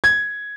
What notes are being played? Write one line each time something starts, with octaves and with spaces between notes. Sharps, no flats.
G#6